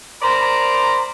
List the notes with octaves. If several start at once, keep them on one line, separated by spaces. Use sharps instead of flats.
A#4 C5 D5 A#5 B5